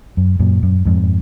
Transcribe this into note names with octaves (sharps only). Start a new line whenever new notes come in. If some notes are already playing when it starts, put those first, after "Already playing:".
F#2
F#2 A#2
F#2
F2 G#2